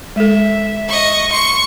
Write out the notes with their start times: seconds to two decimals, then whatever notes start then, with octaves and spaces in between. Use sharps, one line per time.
0.16 G#3 A4 E5
0.89 D#5 C#6
1.32 C6 C#6 C#7